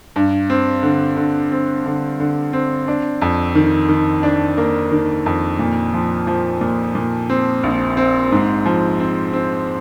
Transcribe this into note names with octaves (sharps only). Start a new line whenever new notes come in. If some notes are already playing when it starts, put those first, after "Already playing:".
G2
C4
D3
D3
C4
D3
D3
C4
D4
F2
D#3
D#3
D4
A#3
D#3
F2
A#2
F3
F3
A#2
A#2
C4
A#1
C4
G#2
F3
C4
C4